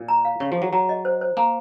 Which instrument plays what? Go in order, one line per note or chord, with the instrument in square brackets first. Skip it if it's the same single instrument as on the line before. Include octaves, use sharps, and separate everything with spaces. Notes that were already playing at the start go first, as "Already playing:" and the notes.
Already playing: [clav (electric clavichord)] A#2
[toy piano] A#5
F5
[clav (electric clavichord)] C#3 [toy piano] C#6
[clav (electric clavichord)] F3
[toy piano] G#4
[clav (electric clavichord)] F#3
[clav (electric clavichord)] F#3 [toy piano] A#5
[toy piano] D#5
C5
C5
[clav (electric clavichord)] A#3 [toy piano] A#5